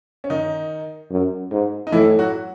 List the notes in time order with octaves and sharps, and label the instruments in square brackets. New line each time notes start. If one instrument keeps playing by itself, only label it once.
[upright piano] C#4
D#3 D#4
[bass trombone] F#2
G#2
[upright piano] D#4
[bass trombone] A2 [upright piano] E3 E4
[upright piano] F#3 F#4